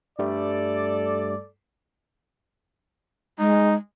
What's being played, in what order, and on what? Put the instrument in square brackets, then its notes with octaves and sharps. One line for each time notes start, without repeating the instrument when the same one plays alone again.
[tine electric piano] G2 G3 A3 [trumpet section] A4 D5
[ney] G#3 [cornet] D#4